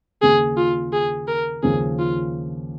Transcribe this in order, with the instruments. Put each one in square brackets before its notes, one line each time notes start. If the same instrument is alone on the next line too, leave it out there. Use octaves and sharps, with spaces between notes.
[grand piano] D#2 C#3 A#3 C#4 [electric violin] G#4
[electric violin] F4
G#4
A#4
[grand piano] D#2 C#3 F3 C#4 [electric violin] G#4
[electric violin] F4